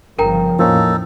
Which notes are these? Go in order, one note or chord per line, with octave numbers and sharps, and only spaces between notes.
G1 C#3 F3 A#4 G5 A#5
E2 A2 F3 A#3 C#4 D#4 A4